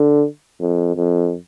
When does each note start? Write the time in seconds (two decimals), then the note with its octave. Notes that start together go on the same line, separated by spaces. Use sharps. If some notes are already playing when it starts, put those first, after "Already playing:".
Already playing: D3
0.61 F2
0.96 F2